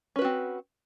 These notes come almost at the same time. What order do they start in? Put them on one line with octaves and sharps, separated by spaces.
C#4 B4 F#4 C4